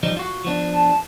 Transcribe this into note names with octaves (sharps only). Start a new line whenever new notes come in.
F3 G3 D#4
F4 F#4
F3 B3 D4
A5